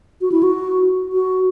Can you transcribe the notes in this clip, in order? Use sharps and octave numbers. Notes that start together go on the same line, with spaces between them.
F#4
E4
F#4
F#4